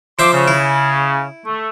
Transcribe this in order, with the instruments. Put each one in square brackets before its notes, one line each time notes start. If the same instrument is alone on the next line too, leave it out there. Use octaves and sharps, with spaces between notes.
[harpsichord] F3 C5 E5 [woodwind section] C6 D6
[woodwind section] C#3
[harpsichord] E4
[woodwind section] A3